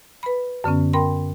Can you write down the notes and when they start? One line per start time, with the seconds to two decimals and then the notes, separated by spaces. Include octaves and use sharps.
0.23 B4 B5
0.64 F#2 D3 B3 C#4
0.93 A#4 G5 B5 C6